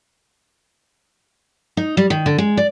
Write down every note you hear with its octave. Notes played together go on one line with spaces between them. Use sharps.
D#4
G3
D#3
D3
G#3
D5